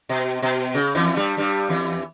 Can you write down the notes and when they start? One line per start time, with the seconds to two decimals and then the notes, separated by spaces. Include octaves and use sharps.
0.09 B2
0.42 B2
0.74 C#3
0.95 E2 E3
1.16 G2 G3
1.37 G2 G3
1.69 E2 E3